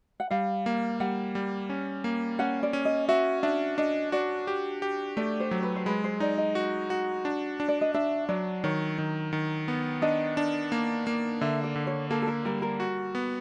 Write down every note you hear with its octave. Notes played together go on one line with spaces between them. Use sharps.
F#5
G3 F5
A#3
G3 F#5
G3
C#4
A#3
C#4 F#5
D5
C#4
D#5
F#4 E5
D4 E5
D4 D#5
F#4 D5
G4
G4
A3 D5
C5
F#3
B4
C5
G#3 B4
C5
D#4 D5
D#5
F#4
F#4
D4
D4
D5
D#5
D4 E5
F#3 D5
D#3 C#5
D#3
D#3
B3
D4 D#5
D4
A#3
A#3
D3 E5
D5
D3
C#5
A#3 A4
A4
A#4
G3 A#4
A#4
F#4
B3